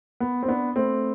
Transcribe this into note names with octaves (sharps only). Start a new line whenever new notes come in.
B3
C4
B3 D4
A3 C4